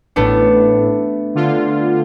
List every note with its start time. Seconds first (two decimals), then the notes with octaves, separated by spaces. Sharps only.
0.16 A1 A2 A3 B3 D4
1.35 D3 F4